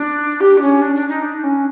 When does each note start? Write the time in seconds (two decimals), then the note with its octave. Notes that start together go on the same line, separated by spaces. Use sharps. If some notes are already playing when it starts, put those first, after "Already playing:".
Already playing: D4
0.41 G4
0.57 D4
0.62 C#4
0.82 D4
0.96 D4
1.09 D#4
1.22 D4
1.44 C#4